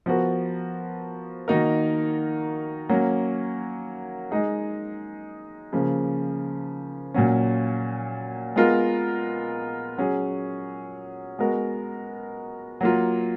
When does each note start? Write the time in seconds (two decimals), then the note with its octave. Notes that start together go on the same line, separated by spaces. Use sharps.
0.06 F3 B3 F#4 A#4
1.48 D#3 A#3 D#4 F#4 A#4
2.89 F#3 A#3 C#4
4.31 G#3 D#4 G#4
5.73 C#3 F3 A#3
7.14 A#2 F#3 C#4
8.56 G#3 B3 F4 A#4
9.98 F#3 C#4 G#4
11.39 G#3 B3 F#4 A#4
12.81 F#3 A#3 F4